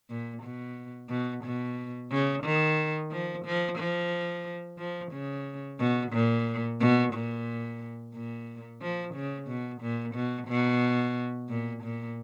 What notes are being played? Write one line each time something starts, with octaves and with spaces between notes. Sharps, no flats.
A#2
B2
B2
B2
C#3
D#3
F3
F3
F3
F3
C#3
B2
A#2
B2
A#2
A#2
F3
C#3
B2
A#2
B2
B2
A#2
A#2